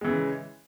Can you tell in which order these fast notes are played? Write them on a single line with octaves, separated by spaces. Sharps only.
G#3 E3 C#3